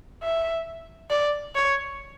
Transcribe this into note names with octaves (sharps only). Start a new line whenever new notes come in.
E5
D5
C#5